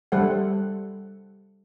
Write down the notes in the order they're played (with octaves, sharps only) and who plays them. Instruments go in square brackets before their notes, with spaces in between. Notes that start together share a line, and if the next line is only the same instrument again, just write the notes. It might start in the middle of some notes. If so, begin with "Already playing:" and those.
[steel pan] G3 A4 C5 F#5